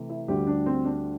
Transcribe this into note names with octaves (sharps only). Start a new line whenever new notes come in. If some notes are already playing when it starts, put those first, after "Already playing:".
Already playing: C3 E3 A3
E4
D2 D3 G3 G4
D4
C4
D4